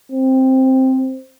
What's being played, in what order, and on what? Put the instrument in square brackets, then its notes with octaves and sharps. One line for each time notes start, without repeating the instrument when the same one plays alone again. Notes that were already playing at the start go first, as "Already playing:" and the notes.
[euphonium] C4